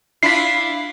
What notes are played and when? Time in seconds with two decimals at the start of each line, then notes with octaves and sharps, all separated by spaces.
0.23 D4 E4 F4 B6 C7